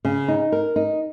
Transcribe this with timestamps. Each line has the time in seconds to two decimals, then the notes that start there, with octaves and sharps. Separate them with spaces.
0.05 C#3
0.28 D#4
0.52 A#4
0.76 D#4